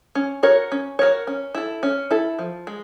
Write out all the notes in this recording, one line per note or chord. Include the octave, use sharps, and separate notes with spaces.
C#4
F#4 A#4 C#5
C#4
F#4 A#4 C#5
C#4
E4 A4
C#4
E4 A4
F3
G#3